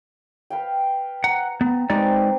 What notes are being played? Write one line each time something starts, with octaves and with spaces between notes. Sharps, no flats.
B4 F5 G5
F#5 A#5
B3 A#5
G#3 C4 D#4 G4 B4 D5